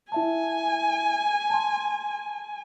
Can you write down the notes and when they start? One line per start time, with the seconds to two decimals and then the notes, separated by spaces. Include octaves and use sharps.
0.12 E4 E5 G#5 A5
1.50 A5 C6